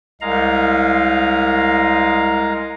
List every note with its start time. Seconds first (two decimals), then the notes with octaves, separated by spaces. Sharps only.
0.21 C2 G#3 F5 A#5